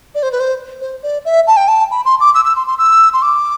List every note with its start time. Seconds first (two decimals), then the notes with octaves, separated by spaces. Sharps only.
0.15 D5
0.23 C5
0.32 B4
0.40 C5
0.81 C5
1.03 D5
1.25 E5
1.47 A5
1.57 G5
1.68 A5
1.91 B5
2.05 C6
2.20 D6
2.35 E6
2.45 E6
2.56 C6
2.67 C6
2.78 E6
3.13 C6
3.22 D6